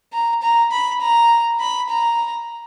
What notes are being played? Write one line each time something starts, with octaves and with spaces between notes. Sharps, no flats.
A#5
A#5
B5
A#5
B5
A#5